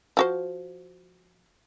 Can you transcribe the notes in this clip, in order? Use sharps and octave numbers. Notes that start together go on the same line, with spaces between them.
F3 F#4 C5